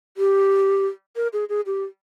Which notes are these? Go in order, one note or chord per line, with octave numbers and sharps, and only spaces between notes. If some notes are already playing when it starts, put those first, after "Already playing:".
G4
A#4
G#4
G#4
G4